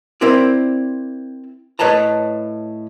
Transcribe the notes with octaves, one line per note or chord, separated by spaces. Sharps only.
C4 E4 A#4 C5 D5
A2 B4 C#5 D#5 A5 A#5